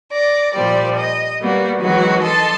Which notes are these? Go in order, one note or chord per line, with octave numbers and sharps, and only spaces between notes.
D5 A#6
A#2 F3 G3 D5
D#5
G3 A#3 B3 F#4
D#3 E3 F#3 G#3 B3 F#4
A4 D#5 A5 C6